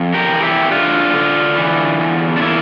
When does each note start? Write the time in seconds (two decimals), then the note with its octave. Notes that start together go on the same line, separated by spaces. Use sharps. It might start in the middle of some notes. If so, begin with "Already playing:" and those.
Already playing: F2
0.14 G4 A#4
0.29 E3
0.43 E4 G4
0.71 D3 D4 F4
1.14 D3
1.56 E3
1.99 E2
2.37 D4
2.42 A#3 E4